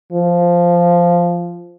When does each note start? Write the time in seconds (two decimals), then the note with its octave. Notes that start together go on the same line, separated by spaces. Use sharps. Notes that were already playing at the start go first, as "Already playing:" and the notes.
0.12 F3